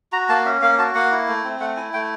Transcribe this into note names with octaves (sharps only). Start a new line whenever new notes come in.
F#4 A#5
A#3 A5
C#4 E5
A#3 F5
F#4 A5
A#3 F#5
E4
A3
C4
A3 F#5
E4 G#5
A3 G5